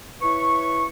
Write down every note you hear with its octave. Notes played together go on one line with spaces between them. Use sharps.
E4 B4 C#5 C#6